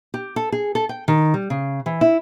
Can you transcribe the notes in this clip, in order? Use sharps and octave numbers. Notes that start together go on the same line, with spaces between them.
G4
A4
G#4
A4
G5
D#3
G3
C#3
E3
E4